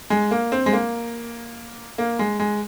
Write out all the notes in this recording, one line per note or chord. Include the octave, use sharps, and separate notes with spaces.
G#3
A#3
C4
G#3
A#3
A#3
G#3
G#3